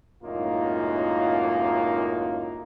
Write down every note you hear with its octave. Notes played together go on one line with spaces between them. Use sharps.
C#2 F#2 A2 A#3 D#4 F4